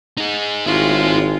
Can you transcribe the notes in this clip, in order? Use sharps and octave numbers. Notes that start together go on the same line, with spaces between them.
D#4 G#4
G#1 G#3 E4 F4 C#5